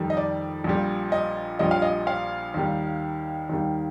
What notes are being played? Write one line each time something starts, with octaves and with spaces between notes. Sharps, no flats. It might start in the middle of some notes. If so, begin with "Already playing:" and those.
Already playing: F2 D#3 G3
D#5
D5
A#1 A#2 G3
D#5
A#1 A#2 G3 D#5
F5
D#5
F5
D#2 D#3 G3
D#2 D#3 G3